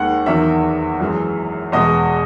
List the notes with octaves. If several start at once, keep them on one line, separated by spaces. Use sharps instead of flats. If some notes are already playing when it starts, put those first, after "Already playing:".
Already playing: D#2 D#3 G#3 F#5
E2 D#3 F#3 E5
F#2 E3 G#3
E2 B2 G#3 D#5